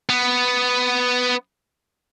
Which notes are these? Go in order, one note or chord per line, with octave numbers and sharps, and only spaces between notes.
B3